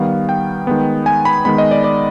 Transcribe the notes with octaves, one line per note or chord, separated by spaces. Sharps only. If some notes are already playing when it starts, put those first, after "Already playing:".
Already playing: D#3 G3 B3 F5
G5
D#3 G#3 B3
G#5
B5
D#3 G#3 B3 B5
D#5
D5
D5